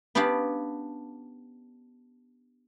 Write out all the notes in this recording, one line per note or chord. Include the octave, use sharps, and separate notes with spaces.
B3 C#4 D4 G4 F5